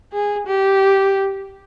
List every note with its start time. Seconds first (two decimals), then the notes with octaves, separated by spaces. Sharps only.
0.13 G#4
0.47 G4